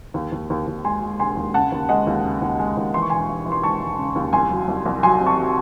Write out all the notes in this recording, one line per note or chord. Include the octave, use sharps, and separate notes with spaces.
D#2
D#2
D#2
D#2
G#3 G#5 C6
G#3
E1 G#5 C6
D#2
C#3 F#5 A5
D#2
G#3 D#5 F#5
D#2
C#3
D#2
G#3
D#2
E3 C6
C#6
E1 G#5 C6
E3
E3
C6
E1 A5 C#6
E1
C#3
D#2
C2 G#5 C6
F#3
C2
C2
F#3 G#5 C6
C3
A5 C#6
F#3